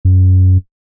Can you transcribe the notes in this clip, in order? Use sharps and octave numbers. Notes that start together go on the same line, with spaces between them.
F#2